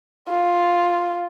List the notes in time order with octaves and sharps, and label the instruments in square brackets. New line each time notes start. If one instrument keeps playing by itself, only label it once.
[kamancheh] F4